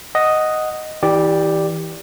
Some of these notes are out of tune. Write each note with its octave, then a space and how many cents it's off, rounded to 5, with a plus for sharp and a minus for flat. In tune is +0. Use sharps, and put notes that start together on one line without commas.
D#5 +0 F#5 +0
E3 -30 G4 +0 D5 +0